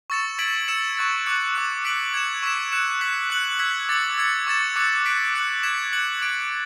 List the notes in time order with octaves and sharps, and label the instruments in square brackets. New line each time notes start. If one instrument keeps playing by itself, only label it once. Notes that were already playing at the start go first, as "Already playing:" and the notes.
[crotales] C#6 E6 A6 C#7 E7
C#6 G#6 B6 D7 F#7
E6 G#6 C#7 E7
C#6 F#6 A6
D6 F#6 C#7
D6 F#6 C#7
F#6 B6 D7 F#7
G#6 C#7 E7
C#6 E6 B6 E7
F#6 C#7 E7
F#6 B6 F#7
F#6 C#7 F#7
E6 G#6 B6
D6 A6 C#7 F#7
E6 G#6 C#7
C#6 E6 A6 E7
D6 F#6 C#7
F#6 B6 D7 F#7
F#6 C#7 F#7
G#6 B6 E7
F#6 C#7 F#7
D6 A6 D7